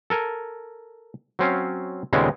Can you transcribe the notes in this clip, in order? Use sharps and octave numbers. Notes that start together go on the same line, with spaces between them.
A4 A#4 G#5
F#3 C4 C#4 F5
D#2 A#2 C#3 G#3 B3 C4